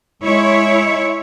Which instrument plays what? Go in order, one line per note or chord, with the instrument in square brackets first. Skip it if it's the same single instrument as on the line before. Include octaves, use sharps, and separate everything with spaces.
[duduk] G#3 [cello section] E4 C#5